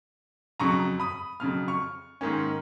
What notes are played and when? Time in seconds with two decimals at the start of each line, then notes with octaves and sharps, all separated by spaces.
0.60 F2 C#3 F#3 A#5 C#6
1.00 B5 D#6
1.40 F2 C#3 F#3 F6
1.68 C#6 F6
2.21 G#2 D#3 A#3 C#4